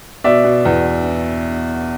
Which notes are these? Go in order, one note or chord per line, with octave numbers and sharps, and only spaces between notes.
B2 D5 E5
B2
E2